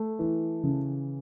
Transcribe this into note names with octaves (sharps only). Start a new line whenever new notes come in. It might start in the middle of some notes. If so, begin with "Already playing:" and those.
Already playing: A3
E3
C#3